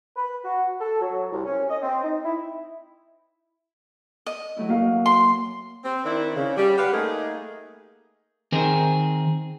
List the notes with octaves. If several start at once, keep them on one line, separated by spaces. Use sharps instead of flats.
B4
F#4
A4
F#3
C2
C#4
D#5
C4
D#4
E4
D#5
F#3 A3 E4
A#3 F#4 F5
C6
C4
D#3 C4 D4 E4
C#3
G3
G4 B4 F5 F#5
A3 A#3 D#4 G#4
D#3 C4 G#4 A#4 C5